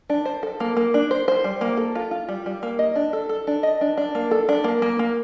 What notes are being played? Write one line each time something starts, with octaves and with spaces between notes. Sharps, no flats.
D4
C5
A4
A#3
A#3
D4
C5
C5
G3
A#3
A4
F4
F4
G3
G3
A#3
D#5
D4
A4
A4
D4
D#5
D4
D4
A#3
A4
D4
A#3
A#3
A#3